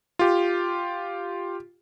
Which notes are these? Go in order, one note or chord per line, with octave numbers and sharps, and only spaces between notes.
F4 G4